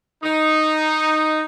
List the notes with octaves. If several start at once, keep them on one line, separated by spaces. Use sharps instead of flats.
D#4